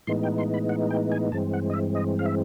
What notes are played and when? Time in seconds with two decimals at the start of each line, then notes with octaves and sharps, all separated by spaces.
0.07 A2 E3 G#3 B3 D#4 C6
0.23 G5
0.38 C6
0.54 B5
0.69 F#5
0.90 G5
1.12 G#5
1.32 G2 E3 G#3 C4 A5
1.53 F#5
1.70 D#5
1.74 E5
1.95 D#5
2.19 F5
2.26 E5